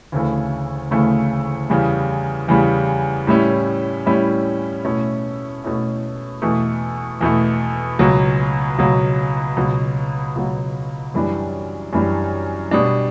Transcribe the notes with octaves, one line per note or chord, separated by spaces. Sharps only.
D2 C#3 E3 A3
D2 C#3 E3 A3
E2 C#3 G3
E2 C#3 G3
A2 G3 C#4 E4
A2 G3 C#4 E4
B2 A3 C#4 E4
B2 A3 C#4 E4
E2 B2 A3
E2 B2 A3
C#2 B2 F#3
C#2 B2 F#3
C#2 B2 F#3
C#2 B2 F#3
F#2 E3 G3 D4
F#2 E3 G3 D4
B2 G3 D4